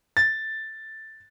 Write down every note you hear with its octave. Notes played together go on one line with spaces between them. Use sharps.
A6